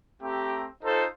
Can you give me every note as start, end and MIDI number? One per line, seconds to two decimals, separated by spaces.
0.22 0.67 57
0.22 0.67 60
0.22 0.67 67
0.22 0.67 82
0.84 1.05 63
0.84 1.05 65
0.84 1.05 69
0.84 1.05 72